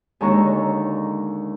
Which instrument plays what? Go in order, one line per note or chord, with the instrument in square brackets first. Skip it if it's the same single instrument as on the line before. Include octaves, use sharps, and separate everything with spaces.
[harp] D#2 D3 G#3 A4 A#5 C#6